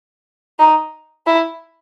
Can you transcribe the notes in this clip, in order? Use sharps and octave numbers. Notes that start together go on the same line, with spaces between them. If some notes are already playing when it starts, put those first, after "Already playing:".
D#4
E4